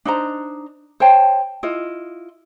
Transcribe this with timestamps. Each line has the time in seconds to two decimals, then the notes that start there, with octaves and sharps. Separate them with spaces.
0.05 D4 D#4 C5 A#5
1.00 C5 C#5 G5 A5
1.63 E4 F4 D#5